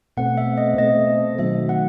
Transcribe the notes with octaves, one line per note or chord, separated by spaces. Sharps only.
B2 A3 C4 F#5
E5
D#5
B2 A3 C4 D#5
D#3 F#3 A3 E5
F#5